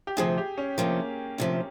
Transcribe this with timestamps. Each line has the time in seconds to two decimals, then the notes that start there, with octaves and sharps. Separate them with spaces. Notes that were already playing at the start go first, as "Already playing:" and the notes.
0.07 G4
0.17 D2 C3 F3 G#4
0.37 G4
0.58 C#4
0.78 D2 C3 F3 A#3
1.38 D2 C3 F3